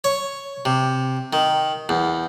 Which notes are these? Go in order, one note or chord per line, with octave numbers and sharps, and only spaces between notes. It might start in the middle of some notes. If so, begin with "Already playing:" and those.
C#5
C3
D#3
E2